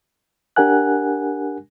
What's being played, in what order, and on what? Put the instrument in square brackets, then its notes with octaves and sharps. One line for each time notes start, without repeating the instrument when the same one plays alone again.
[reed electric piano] D4 G4 A#4 F#5 G#5 F#6